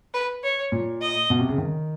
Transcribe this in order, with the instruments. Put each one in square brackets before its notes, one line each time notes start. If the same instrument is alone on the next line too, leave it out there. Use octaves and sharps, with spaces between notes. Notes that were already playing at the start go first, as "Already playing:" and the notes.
[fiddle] B4
C#5
[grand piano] A#2
[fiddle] D#5
[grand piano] B2
C3
C#3
D#3